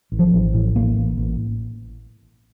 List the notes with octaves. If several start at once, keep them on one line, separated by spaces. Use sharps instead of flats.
A1
F3
A1
A2
A1 A#3
A1
A1